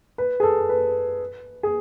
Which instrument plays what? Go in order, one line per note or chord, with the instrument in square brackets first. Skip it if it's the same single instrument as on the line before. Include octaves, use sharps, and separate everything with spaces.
[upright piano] B4
G#4
A4
B4
G#4